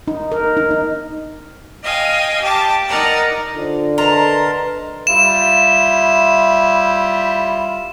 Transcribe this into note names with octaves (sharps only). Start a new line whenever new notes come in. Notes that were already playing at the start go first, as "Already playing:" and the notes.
D#4
A#4
D#4
D#4
D#5 F5 G5 G#5
G4 A5 D6
D#4 A#4 D5 F#5 A#5
D3 F4 C5
A#4 B4 D#5 A5 A#5 C6
G3 E4 F4 E7